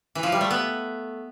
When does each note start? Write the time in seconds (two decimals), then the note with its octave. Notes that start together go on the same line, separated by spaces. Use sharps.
0.15 E3
0.23 F3
0.32 G3
0.41 A3
0.51 B3